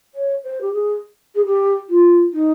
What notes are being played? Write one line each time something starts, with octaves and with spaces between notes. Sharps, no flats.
C#5
C5
G4
G#4
G#4
G4
F4
D#4